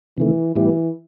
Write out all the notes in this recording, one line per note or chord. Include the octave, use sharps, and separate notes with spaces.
C3 D#3 E3 A3
A2 E3 G3 B3 E4 G4